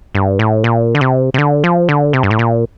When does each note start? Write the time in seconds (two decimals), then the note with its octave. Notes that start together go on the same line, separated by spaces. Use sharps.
0.15 G2
0.39 A2
0.64 A#2
0.95 D3
1.01 C3
1.34 C3
1.38 D3
1.64 F3
1.89 D3
2.13 C3
2.23 G2
2.31 A2
2.39 A#2